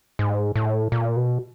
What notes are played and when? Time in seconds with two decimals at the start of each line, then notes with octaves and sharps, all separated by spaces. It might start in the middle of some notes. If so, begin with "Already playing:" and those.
0.19 G#2
0.56 A2
0.92 A#2
1.17 B2